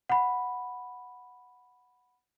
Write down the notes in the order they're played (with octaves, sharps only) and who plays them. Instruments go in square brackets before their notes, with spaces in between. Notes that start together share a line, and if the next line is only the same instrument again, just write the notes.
[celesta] F#5 B5